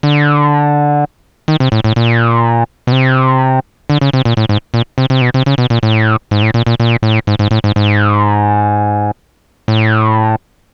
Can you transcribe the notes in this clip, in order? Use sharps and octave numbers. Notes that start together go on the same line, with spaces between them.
D3
D#3
C3
A2
A2
A#2
B2
C3
D3
C#3
C3
A#2
A2
G#2
A#2
C3
C3
B2
C3
C#3
B2
A#2
A2
G#2
A2
A#2
A#2
A#2
A2
G#2
G#2
A2
G#2
G#2
A2